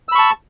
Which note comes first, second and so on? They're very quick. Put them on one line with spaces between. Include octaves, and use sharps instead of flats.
E6 B5 C#6 A5